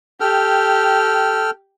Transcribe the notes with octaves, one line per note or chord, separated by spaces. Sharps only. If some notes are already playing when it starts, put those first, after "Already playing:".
G4 A4 G5 F6